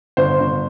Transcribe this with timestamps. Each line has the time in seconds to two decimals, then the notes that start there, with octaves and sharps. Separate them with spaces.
0.17 G1 C5
0.40 G1